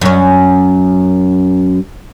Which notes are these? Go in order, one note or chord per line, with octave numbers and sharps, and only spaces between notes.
F#2 C#4